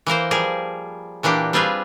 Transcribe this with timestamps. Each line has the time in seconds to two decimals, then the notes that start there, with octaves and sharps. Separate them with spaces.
0.07 E3 A#3 A#4 C5
0.31 F3 G3 G#4 A#4
1.23 A#2 E3 A#3 D4 G4
1.53 G3 C4 F4 G#4 B4